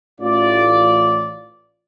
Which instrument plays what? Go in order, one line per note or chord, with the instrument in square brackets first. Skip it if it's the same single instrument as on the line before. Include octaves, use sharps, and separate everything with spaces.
[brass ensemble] A1 F4 D5